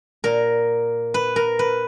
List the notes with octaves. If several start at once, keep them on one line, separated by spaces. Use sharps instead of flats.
A#2 A#4
B4
A#4
B4